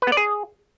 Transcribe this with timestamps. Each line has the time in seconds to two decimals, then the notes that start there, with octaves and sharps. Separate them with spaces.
0.02 B4
0.07 B3
0.12 D5
0.17 G#4